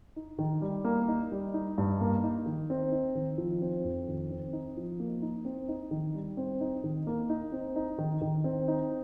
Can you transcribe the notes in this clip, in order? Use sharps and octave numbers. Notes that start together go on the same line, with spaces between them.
D#4
D#3
G3
A#3
D#4
G3
D#4
G2
A#3
D#4
D#3
C4
D#4
D#3
F3
C4
F2
D#3
C4
D#4
F3
A#3
D#4
C4
D#4
D#3
G3
C4
D#4
D#3
A#3
D#4
C4
D#4
D#3
D#3
C4
D#4